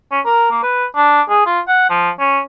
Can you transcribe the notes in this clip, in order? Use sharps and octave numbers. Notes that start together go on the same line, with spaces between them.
C#4
A#4
A#3
B4
D4
G#4
F4
F#5
F3
C#4